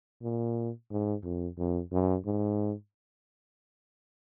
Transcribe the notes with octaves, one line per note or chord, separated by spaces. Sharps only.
A#2
G#2
F2
F2
F#2
G#2